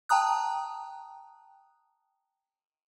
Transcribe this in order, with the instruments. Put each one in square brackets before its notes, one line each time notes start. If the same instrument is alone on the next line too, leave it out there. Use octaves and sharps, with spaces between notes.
[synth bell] G5 A5 A#5 D#6 F#6